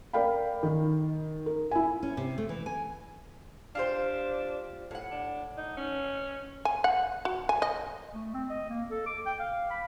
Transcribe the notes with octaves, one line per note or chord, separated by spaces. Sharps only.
A#4 D5 F5 G5 B5
D#3
A#4
E4 G#5
C#4
C3
A3
E3
G#5
D4 F4 G4 C5
A2 F#5
D4
D#4
C#4
G#5
F#5
F#4
G#5
D#5
A3
C4
D#5
A#3
A4
D6
G5
F5
B5